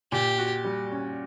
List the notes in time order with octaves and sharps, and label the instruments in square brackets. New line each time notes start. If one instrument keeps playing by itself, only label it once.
[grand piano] A#2 [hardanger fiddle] G4
[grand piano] F#4
G3
C#4